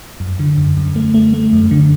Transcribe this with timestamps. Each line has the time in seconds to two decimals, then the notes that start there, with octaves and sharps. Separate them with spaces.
0.20 F#2
0.40 D3
0.58 F#2
0.77 F#2
0.96 A3
1.14 A3
1.34 A3
1.53 F#2
1.71 D3